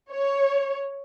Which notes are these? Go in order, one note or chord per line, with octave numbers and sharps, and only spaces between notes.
C#5